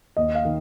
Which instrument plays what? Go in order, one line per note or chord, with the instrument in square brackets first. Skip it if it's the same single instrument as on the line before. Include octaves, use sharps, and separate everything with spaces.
[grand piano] D#2 D#5
F5
D#3